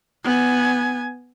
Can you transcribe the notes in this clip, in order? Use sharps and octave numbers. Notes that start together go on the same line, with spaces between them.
B3 G#5